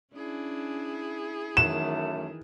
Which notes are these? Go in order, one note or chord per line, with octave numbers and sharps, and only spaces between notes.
C#4 D4 E4 G#4
F#2 D#3 E3 A3 E7